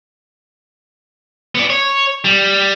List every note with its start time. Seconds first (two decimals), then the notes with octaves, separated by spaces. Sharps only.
1.55 B3 D5
1.70 C#5
2.25 G3